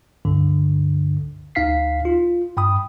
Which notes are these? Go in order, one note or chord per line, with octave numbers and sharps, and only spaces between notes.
C#2 G2 D3
D2 D#4 F5 B6 C7
F4
G2 G5 B5 D#6